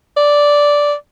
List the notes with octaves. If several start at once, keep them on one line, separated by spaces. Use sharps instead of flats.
D5